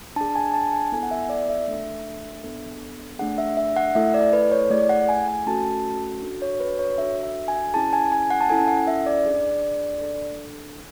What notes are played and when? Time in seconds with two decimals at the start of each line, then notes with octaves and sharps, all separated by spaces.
0.16 D4 G#4 A5
0.36 G#5
0.54 A5
0.73 G#5
0.92 B3 E4 A4 G#5
1.03 F#5
1.11 E5
1.29 D5
1.49 E5
1.68 A3 D4 A4
2.44 B3 D4 A4
3.19 A3 D4 G#4 F#5
3.38 E5
3.57 E5
3.77 F#5
3.95 A3 E4 A4 E5
4.14 D5
4.33 B4
4.52 C#5
4.70 A3 E4 G#4 D5
4.89 F#5
5.09 G#5
5.28 G#5
5.46 A3 C#4 F#4 A4 A5
6.23 D4 F#4 A4
6.42 C#5
6.60 B4
6.79 C#5
6.98 D4 F#4 A4 E5
7.23 E5
7.48 G#5
7.74 C#4 E4 G#4 A5
7.93 G#5
8.12 G#5
8.30 F#5
8.41 A5
8.49 C#4 E4 A4 G#5
8.68 F#5
8.87 E5
9.06 D5
9.26 D4 G#4
10.01 D4 A4